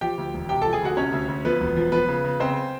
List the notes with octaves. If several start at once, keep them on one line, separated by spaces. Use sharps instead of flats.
F3 G4 G5
D2
E1
C3 G4 G5
F3 A4 A5
G#4 G#5
D2 F#4 F#5
C3 C#4 C#5
D2
D2
F3 B3 B4
E1
F3
F3 B3 B4
C#3
C#3
C#3 C4 C5